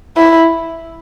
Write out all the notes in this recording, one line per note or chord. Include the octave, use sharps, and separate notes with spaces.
E4